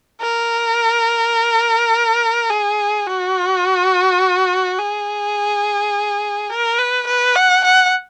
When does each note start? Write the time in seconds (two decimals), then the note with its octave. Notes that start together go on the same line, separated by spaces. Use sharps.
0.22 A#4
2.50 G#4
3.07 F#4
4.79 G#4
6.50 A#4
6.78 B4
7.07 B4
7.36 F#5
7.65 F#5